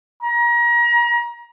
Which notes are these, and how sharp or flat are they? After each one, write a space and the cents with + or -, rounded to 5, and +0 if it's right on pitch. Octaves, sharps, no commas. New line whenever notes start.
A#5 +30